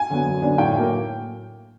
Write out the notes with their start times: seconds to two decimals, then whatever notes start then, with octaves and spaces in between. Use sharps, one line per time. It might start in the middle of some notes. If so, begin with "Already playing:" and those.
Already playing: G#5
0.10 D3 F#3 B3
0.26 F#2
0.42 D3 F#3 B3 D4
0.58 A2 G5
0.74 F#3 A#3